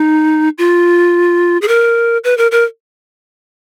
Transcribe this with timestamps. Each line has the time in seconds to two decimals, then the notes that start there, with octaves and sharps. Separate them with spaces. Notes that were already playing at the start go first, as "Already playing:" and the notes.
Already playing: D#4
0.58 F4
1.62 G#4
1.68 A#4
2.24 B4
2.37 A#4
2.51 A#4